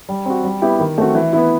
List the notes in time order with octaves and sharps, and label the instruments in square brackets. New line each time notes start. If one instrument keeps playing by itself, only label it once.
[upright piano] G3
C4 F#4
G3
B3 E4 G4
D#3
A3 C4 F#4
E3
B3 E4